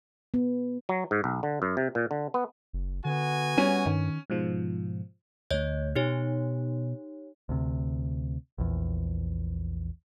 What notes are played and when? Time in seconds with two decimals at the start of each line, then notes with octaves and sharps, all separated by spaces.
0.34 B3
0.89 F#3
1.11 G#2
1.24 B1
1.43 D3
1.62 F#2
1.77 C3
1.95 A#2
2.11 D3
2.34 B3
2.73 F#1
3.05 D3 B3 F#4 G#5
3.58 G3 C#4
3.86 G2 D#3
4.30 G#2 B2 F3
5.50 D2 A3 C#5 D#5 G6
5.96 B2 D#4 G4 C#5
7.49 D2 C3
8.58 A#1 E2